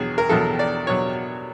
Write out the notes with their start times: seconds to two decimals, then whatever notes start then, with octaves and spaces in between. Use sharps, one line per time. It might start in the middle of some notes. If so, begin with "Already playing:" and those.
Already playing: E2 B2 F#3 G#4
0.18 A#4
0.29 E2 B2 F#3 A4
0.59 D5
0.87 B2 F#3 C#5